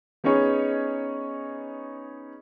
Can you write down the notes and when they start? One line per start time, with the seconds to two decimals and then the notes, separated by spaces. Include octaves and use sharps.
0.24 B3 C#4 D#4 G#4 C#5